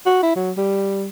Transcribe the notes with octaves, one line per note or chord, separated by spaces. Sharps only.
F#4
E4
F#3
G3